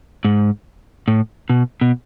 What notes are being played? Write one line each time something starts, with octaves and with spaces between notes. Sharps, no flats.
G#2
A2
B2
B2